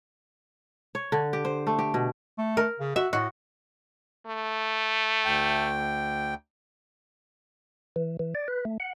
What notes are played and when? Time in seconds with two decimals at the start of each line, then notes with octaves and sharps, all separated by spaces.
0.95 C#5
1.12 D3
1.33 G4
1.45 C5
1.67 A3
1.79 G4
1.94 B2
2.38 A3
2.57 A#4
2.80 C#3
2.96 F#4 E5
3.13 A2 F#4
4.27 A3
5.25 D2 G5
7.96 E3
8.19 E3
8.35 D5
8.48 B4
8.65 A3
8.80 F#5